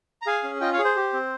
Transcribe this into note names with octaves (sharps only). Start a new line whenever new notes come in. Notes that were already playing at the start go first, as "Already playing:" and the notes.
A#5
G#4 F5 G#5
C#4
F4 D#5 G5
C#5 F5
G#4
C5
G4
C4